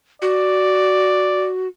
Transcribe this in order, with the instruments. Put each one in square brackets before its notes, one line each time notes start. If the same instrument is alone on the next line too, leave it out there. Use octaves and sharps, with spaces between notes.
[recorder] F#4 [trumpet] D5